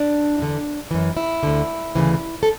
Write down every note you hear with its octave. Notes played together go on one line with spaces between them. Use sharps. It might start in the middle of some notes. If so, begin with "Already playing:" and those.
Already playing: D4
E2 D3
F#2 E3
E4
D2 D3
D2 C#3 E3
A4